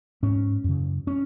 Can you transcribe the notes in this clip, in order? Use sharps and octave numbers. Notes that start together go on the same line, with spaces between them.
G#2 C#4
F#2 C#3
C#4